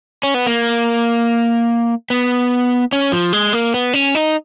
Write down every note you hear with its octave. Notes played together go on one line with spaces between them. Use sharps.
C#4
B3
A#3
B3
C#4
F3
G#3
A#3
B3
C#4
D#4